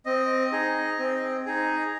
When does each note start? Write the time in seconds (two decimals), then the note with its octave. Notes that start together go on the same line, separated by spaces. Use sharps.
0.06 C4 D#5
0.52 D#4 G#4
0.99 C4
1.46 D#4 G#4